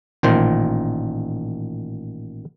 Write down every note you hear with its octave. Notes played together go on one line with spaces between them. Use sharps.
A1 A#2 D#3 C5